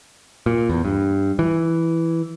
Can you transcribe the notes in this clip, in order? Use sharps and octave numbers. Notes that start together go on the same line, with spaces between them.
A#2
E2
G2
E3